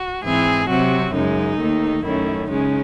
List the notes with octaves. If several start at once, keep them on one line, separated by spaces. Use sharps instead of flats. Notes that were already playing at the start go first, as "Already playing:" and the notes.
Already playing: F#4
G#2 E3 C4 G#4
C3 F#3 C4 F#4
F#2 C#3 G#3 D#4
D#2 D#3 A3
F#2 D#3 A3 C#4 E4
C#3 G#3 C#4 D#4